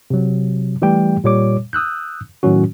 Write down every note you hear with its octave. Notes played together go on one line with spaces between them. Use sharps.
C3 F#3
E3 G3 A3 G4 G5
A#2 G3 C#5 D6
D#6 E6 F#6 G6
A2 D#3 F#3 C#4 F#4